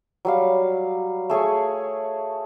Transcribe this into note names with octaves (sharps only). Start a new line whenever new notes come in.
F#3 G3 F5
A3 G#4 C#5 G#5